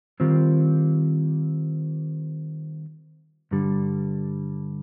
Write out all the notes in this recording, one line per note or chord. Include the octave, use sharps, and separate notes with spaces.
D#3 G3 C4 F4
G2 D3 G3